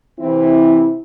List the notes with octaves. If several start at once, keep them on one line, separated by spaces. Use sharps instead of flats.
C3 E3 C4 E4